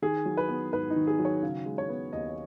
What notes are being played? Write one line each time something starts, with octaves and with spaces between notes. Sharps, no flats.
D#3 G#4
F#3
B4
B3
G#2 B4
D#4
D#3
G#4
F#3
C#5
C#3
G#3
C#5
B3
D#2 D#5